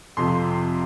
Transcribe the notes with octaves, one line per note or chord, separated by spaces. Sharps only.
F2 C3 F3 C6
C6